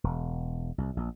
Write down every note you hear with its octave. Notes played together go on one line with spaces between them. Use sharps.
E1
C2
A#1